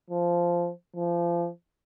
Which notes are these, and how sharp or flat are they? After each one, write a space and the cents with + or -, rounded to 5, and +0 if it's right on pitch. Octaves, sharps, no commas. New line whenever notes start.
F3 -10
F3 -25